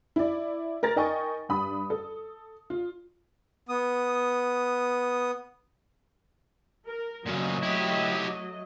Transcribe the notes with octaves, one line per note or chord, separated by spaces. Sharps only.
E4 D5
A#4 A#5 A6
D#4 A#4 D#5 G5 G#5 C#6
G2 B5 D#6
A4
F4
B3 D#6
A#4
A#2 C#3 F#3 A3 D#5
E4 G4